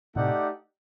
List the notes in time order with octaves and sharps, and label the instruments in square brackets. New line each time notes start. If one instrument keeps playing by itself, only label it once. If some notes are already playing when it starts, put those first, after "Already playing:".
[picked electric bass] A2 C3 [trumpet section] A3 D#4 G4 D5 F#5